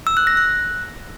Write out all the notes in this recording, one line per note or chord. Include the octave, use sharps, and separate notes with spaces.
E6
F#6
A#6
F#6